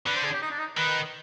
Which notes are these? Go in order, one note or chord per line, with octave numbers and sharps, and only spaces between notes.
D3 B4
C5
G#4
G4
D#4
D4
D#4
D#3 B4